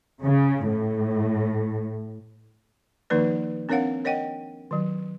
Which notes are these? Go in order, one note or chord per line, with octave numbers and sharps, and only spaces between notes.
C#3
A2
D#3 F3 A#3 D#4 B4 D5
C4 D4 A#4 C#5 F5 F#5
A#4 C#5 D#5 F#5 G5
D#3 F#3